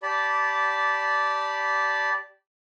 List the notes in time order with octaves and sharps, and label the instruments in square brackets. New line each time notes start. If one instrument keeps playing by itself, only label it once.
[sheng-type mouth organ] G4 D5 A5 B5